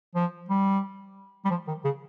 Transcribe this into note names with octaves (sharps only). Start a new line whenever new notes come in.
F3
G3
G3
F3
D#3
C#3